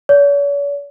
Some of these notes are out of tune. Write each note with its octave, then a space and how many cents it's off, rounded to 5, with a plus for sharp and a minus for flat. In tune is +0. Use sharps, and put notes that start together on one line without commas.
C#5 +45